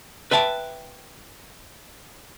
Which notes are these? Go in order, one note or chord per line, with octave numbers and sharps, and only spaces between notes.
B4 E5 G5 A5